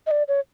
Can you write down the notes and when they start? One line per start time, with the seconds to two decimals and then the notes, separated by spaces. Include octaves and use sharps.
0.07 D#5
0.11 D5
0.28 C#5